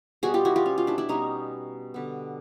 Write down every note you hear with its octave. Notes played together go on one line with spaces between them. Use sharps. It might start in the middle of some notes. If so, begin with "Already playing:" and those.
B2 G3 B3 F#4 G#4
F4 G4
E4 F#4
F4 G4
C#4
F4
D4 E4
D4 E4
B2 G3 B3 C#4 D#4
D3 G3 B3